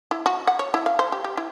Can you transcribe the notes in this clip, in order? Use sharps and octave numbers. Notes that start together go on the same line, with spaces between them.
E4
F#4
F#5
C#5
E4
F5
C5
G4
G4
E4